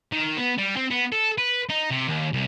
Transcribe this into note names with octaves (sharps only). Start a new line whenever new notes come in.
D#3
B3
G3
C4
B3
A4
B4
D#4
C3
D#2
C2